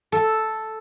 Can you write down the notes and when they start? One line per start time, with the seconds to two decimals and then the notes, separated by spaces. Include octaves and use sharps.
0.12 A4